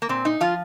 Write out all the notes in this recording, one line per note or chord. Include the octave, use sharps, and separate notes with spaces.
A#3
A#2 C4
D#4
F3 F4